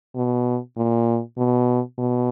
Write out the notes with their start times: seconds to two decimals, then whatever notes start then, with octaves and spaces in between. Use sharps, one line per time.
0.16 B2
0.77 A#2
1.38 B2
1.98 B2